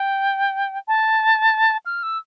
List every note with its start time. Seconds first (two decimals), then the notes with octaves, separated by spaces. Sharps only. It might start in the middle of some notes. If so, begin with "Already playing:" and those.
Already playing: G5
0.88 A5
1.86 F6
2.03 E6